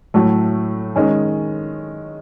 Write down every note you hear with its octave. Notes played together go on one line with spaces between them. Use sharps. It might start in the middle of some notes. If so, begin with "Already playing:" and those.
A2 F#3 A3
D#3 G#3 C#4